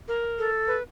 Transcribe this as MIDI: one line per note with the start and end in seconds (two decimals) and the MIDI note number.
0.08 0.50 70
0.39 0.76 69
0.67 0.82 71